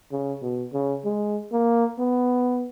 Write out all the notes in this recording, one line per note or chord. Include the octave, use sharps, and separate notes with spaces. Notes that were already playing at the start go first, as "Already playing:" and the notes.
C#3
B2
C#3
G#3
A#3
B3